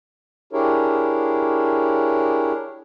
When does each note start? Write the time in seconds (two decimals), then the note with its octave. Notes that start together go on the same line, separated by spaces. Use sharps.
0.53 D4 E4 G4 G#4 A#4 C#5